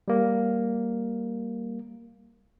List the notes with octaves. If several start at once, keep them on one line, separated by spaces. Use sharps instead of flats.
G3 A#3